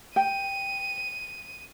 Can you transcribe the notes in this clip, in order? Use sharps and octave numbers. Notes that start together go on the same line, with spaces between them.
G5 D#7